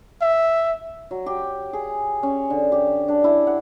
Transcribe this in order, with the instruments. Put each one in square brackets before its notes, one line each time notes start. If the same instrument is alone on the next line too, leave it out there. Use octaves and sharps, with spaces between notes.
[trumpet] E5
[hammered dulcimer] F#3
G4
G#4
C#4
D3
G4
D4
E4
F#5